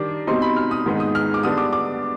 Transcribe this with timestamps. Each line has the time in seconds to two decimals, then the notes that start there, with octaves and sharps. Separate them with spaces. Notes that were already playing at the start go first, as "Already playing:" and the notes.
Already playing: D#3 G3 D4 D6
0.27 B2 G3 C4 D#4 C6
0.42 B5
0.56 F6
0.71 D#6
0.86 G#2 D#3 G#3 B3 D#4
1.00 D#6
1.15 F6
1.34 D6
1.43 D3 G3 B3 D4 D#6
1.58 D6
1.73 D6